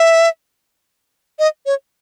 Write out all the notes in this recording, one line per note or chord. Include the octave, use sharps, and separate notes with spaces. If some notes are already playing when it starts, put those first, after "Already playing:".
Already playing: E5
D#5
C#5